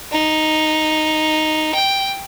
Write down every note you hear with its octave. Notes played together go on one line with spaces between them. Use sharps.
D#4
G5